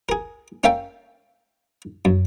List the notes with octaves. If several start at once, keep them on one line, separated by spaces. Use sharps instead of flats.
G#4 A#4
C#4 A#4 E5 F5 G5 A5
F#2